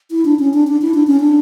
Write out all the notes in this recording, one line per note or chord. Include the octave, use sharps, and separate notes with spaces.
E4
D4
C#4
D4
D4
E4
D4
C#4
D4